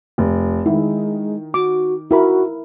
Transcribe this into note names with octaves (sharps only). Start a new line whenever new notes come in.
F1
D#3 G#3 E4
F#4 D6
E4 F#4 A#4 B5